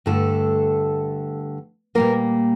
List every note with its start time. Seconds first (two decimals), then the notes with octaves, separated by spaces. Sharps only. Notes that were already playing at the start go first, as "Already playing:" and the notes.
0.06 G2 D3 A3 A4
1.95 A#2 G3 A#3 A#4